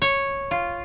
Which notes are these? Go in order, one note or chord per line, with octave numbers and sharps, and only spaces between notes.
C#5
F4